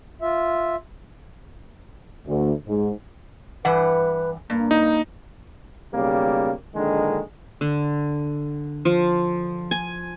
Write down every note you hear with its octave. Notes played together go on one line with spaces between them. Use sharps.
F4 E5
D2
G#2
G2 E3 B4 F#5
G2 A#3
D#4
B1 C#3 G3 A#3
A#1 D3 D#3 G#3
D3
F3
G#5